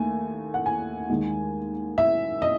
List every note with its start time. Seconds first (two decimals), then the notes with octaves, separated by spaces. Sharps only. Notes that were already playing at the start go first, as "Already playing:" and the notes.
Already playing: D#2 A3 G#5
0.54 F#5
0.66 G#5
1.10 D#2 D#3 G#3
1.98 E5
2.42 D#5